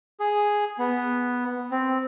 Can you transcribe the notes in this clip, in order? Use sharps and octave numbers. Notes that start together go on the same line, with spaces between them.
G#4
B3
C4